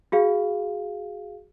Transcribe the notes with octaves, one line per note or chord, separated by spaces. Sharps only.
F#4 G#4 F5